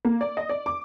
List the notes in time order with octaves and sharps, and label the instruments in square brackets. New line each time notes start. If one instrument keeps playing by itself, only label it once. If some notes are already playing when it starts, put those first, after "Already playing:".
[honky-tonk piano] A#3
D5
D#5
D5
D6